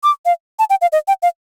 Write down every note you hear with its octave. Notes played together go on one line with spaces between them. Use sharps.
D6
F5
A5
G5
F5
D#5
G5
F5